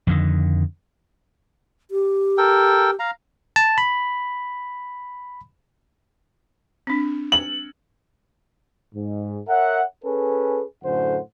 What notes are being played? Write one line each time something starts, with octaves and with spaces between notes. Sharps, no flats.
F2 D3 D#3
G4
A4 A#4 G5
F5 A#5
A5
B5
C4 D4
F#7
G#2
A#4 C#5 E5 F#5
C#4 G#4 A4 B4
F#2 A2 D3 C5 F#5